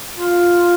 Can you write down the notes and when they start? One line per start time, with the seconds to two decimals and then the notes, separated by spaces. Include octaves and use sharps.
0.15 F4